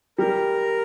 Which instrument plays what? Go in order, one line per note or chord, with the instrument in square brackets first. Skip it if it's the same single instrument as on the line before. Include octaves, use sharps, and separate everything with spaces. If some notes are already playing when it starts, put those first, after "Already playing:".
[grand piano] G3 [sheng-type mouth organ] A#4